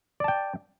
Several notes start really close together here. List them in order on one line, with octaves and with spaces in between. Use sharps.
D5 A5 G5